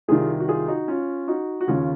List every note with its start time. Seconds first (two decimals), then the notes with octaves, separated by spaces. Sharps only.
0.08 C2 C3 D#3 F4 G#4
0.40 F#4
0.48 F4 G#4
0.68 D#4 F#4
0.88 C#4 F4
1.28 D#4 F#4
1.61 F#4
1.67 D#2 C#3 C#4 F4